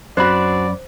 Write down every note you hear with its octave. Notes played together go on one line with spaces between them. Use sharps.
F#2 C4 D4 F#4 C5 D5 B5